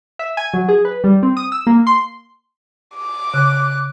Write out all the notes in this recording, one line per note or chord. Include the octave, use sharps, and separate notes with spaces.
E5
G#5
F#3
G#4
B4
G3
C4
D#6
E6
A#3
C6
D6
C#3 F#6